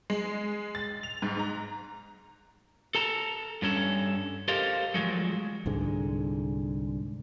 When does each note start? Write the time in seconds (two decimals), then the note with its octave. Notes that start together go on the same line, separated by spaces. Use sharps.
0.10 G#3
0.75 A6
1.03 F7
1.22 G#2
1.39 A#5
2.95 A4 A5 A#5
3.62 G2 C#4 A4
4.48 G4 A4 A#4 C5 D#5 F5
4.94 F3 F#3 G#3 A3
5.66 C2 G#2 D3 G#3